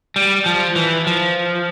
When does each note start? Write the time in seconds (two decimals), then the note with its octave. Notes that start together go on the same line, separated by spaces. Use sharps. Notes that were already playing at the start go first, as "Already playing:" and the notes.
0.16 G3
0.46 F3
0.76 E3
1.07 F3